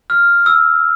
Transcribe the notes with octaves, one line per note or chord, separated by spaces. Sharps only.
F6
E6